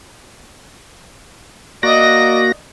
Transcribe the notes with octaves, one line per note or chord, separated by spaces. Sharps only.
A#3 F#4 D5 D#5 A#6